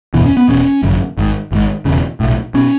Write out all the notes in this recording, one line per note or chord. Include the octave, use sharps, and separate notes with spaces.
F#1 E2 B2 E3
C#4
B3
E1 E2 B2 C#4
G#1 F#2 C#3
G#1 G#2
G#1 G#2
E1 E2 C#3
B1 A2
B2 C#4